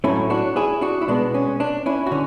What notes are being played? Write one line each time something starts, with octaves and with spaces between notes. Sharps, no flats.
A2 F#3 A3 C#4 E4
D4 F#4
E4 G#4
D4 F#4
E4
B2 G#3 B3 D4
C#4
D4
C#4 E4
F#4
D3 C#4